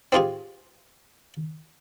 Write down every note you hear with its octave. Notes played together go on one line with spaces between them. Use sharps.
C4 D#4 F4 G4 G#4